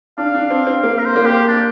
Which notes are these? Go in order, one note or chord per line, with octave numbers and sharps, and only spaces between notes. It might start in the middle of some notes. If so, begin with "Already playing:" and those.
D4 F5
D4
C4
C4
A#3 F5
A#4
C5
A#3
G4
D4